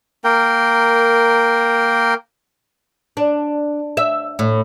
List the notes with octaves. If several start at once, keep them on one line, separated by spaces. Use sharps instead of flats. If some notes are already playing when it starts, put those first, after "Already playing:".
A#3 A#4 G5
D4
E5
A2